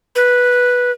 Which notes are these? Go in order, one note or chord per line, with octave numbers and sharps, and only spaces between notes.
B4